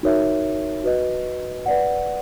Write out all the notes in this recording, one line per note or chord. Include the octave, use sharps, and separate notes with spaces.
D#4 F#4 A#4 C#5 E5
F#4 B4 D#5
B4 D5 F#5